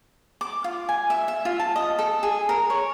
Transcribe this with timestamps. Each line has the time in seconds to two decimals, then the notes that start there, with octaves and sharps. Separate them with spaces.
0.41 D6
0.64 F4
0.89 G#5
1.10 E5
1.28 E5
1.45 F4
1.60 A5
1.76 D#5
1.99 A4
2.23 G#4
2.49 A#4
2.70 C#5